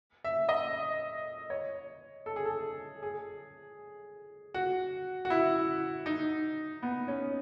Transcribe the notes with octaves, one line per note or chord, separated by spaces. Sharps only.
E5
D#5
C#5
A4
G#4
A4
G#4
F#4
F#4
E4
D#4
B3
C#4